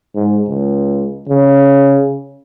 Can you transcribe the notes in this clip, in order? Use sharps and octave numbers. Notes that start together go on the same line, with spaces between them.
G#2
C#2
C#3